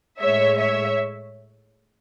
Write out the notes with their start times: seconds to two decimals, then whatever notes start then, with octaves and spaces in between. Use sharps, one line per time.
0.20 A2 G#3 C#5 E5
0.57 C#5 E5